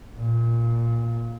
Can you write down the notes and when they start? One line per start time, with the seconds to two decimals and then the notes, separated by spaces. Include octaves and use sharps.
0.18 A#2